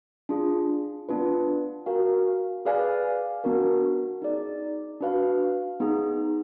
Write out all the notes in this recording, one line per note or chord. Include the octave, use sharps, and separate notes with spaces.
D4 F4 G#4
B3 D4 F4 B4
F#4 A#4 F5 G#5
G#4 B4 D5 F5 G#5
B3 D4 F#4 A#4
D#4 G#4 D5
D4 F#4 B4 F5
B3 D#4 G#4